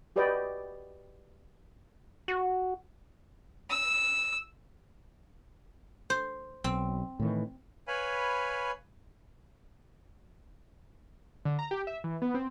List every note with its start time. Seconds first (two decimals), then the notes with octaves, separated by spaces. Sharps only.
0.16 F#4 G4 B4 D5 D#5 G5
2.28 F#4
3.69 E6
6.10 C5
6.64 B1 C4
7.19 A2 D#3 E3
7.88 B4 C#5 F5 G#5 B5
11.45 D3
11.59 A#5
11.71 G4
11.87 E5
12.04 E3
12.22 B3
12.34 C4